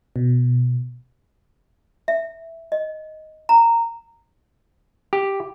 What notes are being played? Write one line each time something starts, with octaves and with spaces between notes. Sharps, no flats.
B2
E5
D#5
A#5
G4